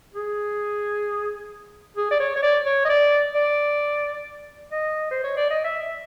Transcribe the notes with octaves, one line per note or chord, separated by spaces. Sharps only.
G#4
G#4
D5
C#5
C#5
D5
C#5
D#5
D5
D5
D#5
C5
C#5
D5
D#5
E5